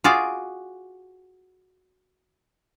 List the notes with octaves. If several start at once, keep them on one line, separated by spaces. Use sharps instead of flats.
F4 F#4 G#4 D5